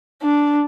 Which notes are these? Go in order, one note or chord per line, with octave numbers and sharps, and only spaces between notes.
D4